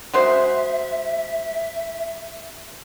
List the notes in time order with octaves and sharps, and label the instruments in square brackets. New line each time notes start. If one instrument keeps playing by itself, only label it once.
[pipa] F#3 G#3 C5 [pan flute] E5